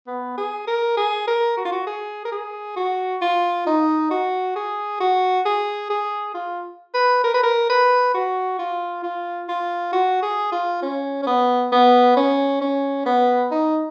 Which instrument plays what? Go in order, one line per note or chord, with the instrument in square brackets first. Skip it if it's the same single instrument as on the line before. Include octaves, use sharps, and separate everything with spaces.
[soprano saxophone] B3
G#4
A#4
G#4
A#4
F#4
F4
F#4
G#4
A#4
G#4
F#4
F4
D#4
F#4
G#4
F#4
G#4
G#4
F4
B4
A#4
B4
A#4
B4
F#4
F4
F4
F4
F#4
G#4
F4
C#4
C#4
B3
B3
C#4
C#4
B3
D#4